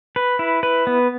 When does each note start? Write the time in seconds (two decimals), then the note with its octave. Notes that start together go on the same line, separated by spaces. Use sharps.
0.16 B4
0.39 E4
0.63 B4
0.87 B3